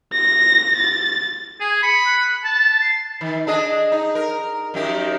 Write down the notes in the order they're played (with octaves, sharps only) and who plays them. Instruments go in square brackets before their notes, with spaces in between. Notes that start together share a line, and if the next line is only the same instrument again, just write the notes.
[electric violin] A#6
A6
[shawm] G#4 [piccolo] G#5
[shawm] B5 [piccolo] C#7
[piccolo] F#6
[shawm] A5 [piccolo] A6
[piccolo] C7
[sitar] D#3
D4 G#4 D#5
D#4
A#4
F#2 D#3 G4